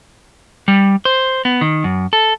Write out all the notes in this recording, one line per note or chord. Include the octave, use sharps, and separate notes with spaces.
G3
C5
B3
D#3
F#2
A4